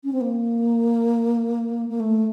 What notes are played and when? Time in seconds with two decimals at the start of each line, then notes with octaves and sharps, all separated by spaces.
0.04 C#4
0.13 C4
0.21 A#3
1.90 A#3
2.00 A3